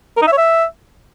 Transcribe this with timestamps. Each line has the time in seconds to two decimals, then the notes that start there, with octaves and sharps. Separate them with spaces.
0.17 A#4
0.22 D#4
0.27 E5
0.32 C#5
0.37 E5